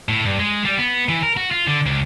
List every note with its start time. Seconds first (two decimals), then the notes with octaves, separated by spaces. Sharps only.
0.09 A2
0.25 G2
0.39 G#3
0.65 G3
0.78 B3
1.09 E3
1.23 A#4
1.37 F#4
1.51 F4
1.67 D3
1.86 C#2